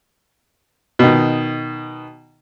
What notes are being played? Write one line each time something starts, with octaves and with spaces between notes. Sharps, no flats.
B2 D#3